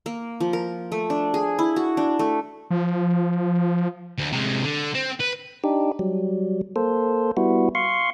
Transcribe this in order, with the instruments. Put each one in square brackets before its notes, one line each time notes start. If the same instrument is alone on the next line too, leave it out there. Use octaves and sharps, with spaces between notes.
[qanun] A#3
F3
A#4
A3
D4
G#4
E4
F#4
D4
A3
[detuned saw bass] F3
[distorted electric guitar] D2
C3 G#3
D3
C4
B4
[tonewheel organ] D4 D#4 G4
F#3 G3
A#3 A4 C5
G3 B3 E4 F#4
F5 C6 C#6